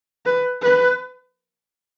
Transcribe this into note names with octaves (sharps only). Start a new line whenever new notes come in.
B4
B4